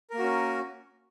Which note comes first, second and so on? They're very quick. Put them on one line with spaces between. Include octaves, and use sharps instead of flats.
A#4 A#3 F#4 C#4